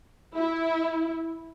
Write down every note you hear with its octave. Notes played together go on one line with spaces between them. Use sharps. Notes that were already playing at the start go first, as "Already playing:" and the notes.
E4